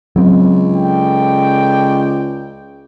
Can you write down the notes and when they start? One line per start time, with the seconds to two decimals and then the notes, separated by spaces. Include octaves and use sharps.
0.16 C#2 F#3 C4
0.75 A4 D5 G5